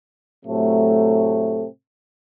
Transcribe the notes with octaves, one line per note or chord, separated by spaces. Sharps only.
A2 C3 F#3 A3